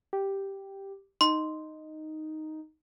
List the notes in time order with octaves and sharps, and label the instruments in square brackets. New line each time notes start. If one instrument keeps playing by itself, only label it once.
[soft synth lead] G4
[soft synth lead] D#4 [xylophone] C6